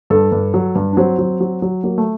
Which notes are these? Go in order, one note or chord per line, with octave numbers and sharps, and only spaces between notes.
G2 A4
G2
F#3
G2
D4
F#3 C4
F#3
F#3
F#3
F#3 A#3
A3